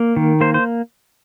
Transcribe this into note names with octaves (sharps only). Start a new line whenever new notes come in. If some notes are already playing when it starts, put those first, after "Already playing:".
Already playing: A#3
D#3
A#3 C5
C5